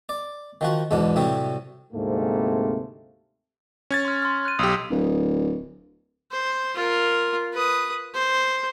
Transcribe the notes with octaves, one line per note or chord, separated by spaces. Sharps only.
D5
D#3 F3 F#4
E2 G#2 B2 D4
A2 C3 F#3 G3
D2 G#2 C3 A3 A#3 C4
C#4 G#6 A6
C6 F6
C6 F6
F#6 D#7
B1 G4 D#6 E6 B6
D1
C5
F4 A#4
B4 D#6
C5